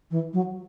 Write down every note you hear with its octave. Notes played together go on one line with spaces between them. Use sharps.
E3
F#3